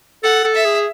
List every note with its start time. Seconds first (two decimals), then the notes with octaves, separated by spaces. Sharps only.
0.24 A4 F#5
0.44 A4
0.55 E5
0.65 G#4